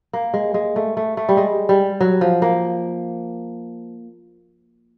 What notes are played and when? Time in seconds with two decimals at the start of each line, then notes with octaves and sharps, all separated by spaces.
0.13 A#3
0.34 G#3
0.54 G#3
0.76 A3
0.97 A3
1.17 A3
1.29 G3
1.37 G#3
1.69 G3
2.00 F#3
2.21 F3
2.42 A#3